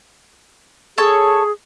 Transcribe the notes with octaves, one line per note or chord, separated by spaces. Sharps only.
G#4 A4 C#5